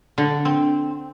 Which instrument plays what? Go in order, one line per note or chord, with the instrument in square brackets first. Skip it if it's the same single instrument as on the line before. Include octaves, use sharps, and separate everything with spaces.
[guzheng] D3
C4